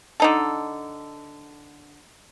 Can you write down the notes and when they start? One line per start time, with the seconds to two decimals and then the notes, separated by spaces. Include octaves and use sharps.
0.20 D3 D#4 A4